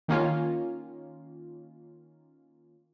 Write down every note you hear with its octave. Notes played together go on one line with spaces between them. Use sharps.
D#3 A#3 C#4 F4